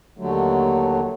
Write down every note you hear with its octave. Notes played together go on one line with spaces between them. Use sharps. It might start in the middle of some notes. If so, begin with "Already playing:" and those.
D#2 D3 F#3 A3